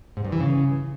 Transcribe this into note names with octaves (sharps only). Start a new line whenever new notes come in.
G#2
G2
E3
C#3